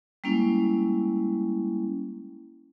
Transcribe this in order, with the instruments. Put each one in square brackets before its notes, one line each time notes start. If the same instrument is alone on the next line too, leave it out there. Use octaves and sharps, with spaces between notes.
[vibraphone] G3 G#3 A#3 C#4 E4